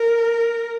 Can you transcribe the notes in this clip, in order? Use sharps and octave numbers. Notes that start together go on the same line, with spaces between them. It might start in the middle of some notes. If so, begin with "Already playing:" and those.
Already playing: A#4